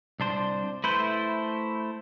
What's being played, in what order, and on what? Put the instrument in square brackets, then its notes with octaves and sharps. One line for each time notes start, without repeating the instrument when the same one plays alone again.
[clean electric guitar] C2 D4 C5
[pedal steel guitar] A3 E4 C5 [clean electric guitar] B4